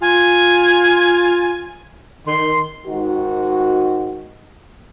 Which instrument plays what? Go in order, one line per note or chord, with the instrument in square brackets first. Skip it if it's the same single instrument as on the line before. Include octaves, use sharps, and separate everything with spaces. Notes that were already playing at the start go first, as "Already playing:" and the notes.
[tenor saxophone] F4 [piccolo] G#5
[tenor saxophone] D#3 [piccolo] C6
[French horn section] G#2 D#3 D#4 F#4